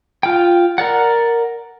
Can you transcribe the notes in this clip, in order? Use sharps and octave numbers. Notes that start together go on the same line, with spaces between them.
F4 G5
A#4 D5 F#5